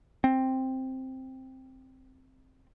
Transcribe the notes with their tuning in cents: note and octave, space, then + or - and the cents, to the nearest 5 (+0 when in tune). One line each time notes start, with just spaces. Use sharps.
C4 +5